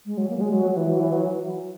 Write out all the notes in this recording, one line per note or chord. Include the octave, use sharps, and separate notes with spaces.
G#3
F#3
A#3
F#3
G#3
F#3
F#3
E3
F#3
E3
F#3